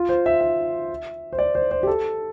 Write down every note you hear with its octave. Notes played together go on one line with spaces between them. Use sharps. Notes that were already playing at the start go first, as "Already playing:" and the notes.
Already playing: F4
C5
E5
E5
C5
D5
C5
C5
G4
A4